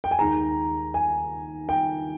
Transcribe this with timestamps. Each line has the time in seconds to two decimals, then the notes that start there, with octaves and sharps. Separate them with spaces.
0.04 G5
0.11 G#5
0.18 D#2 D#3 G#3 A#5
0.94 G#5
1.69 G5